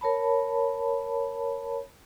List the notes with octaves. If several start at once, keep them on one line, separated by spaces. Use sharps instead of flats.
A#4 C#5 A5 B5